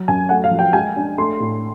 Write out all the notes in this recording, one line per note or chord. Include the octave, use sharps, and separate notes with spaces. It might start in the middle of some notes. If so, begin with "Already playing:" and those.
Already playing: F#3
F#2 G#5
A3 F#5
F5
F3
G5
G#3 G#5
D4
A3 C6
A2